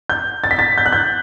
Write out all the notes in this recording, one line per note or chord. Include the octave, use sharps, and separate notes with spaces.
G6
A6
B6
A6
G6
F#6
G6